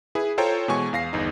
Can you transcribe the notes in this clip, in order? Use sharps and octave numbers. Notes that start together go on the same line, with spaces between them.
E4 G#4 B4
F4 A4 C5 C#5 G5 A#5
B2 E3 G#3 G#5 C#6
E2 F5 A#6 C7
G1 E2 D#4